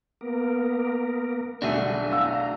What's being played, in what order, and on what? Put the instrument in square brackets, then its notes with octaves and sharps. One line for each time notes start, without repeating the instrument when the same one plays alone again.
[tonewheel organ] A#3 B3 A#4
[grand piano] B1 A3 E5 [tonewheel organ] D3 G3 [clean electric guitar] D4 F#4 G#4
[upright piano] F5 E6 [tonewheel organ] A#5